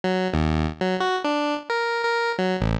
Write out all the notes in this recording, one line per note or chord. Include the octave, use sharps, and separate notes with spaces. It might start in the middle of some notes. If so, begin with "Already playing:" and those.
F#3
D#2
F#3
F#4
D4
A#4
A#4
F#3
A1